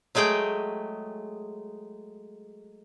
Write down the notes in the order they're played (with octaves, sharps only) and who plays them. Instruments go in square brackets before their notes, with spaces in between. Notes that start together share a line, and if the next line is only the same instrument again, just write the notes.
[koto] F#3 G#3 A3 G#4 G5